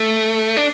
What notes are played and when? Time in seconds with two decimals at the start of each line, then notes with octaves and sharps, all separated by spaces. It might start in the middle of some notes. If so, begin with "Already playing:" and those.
Already playing: A3
0.57 D4